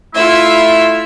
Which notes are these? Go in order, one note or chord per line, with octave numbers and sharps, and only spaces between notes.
A3 E4 F4 E5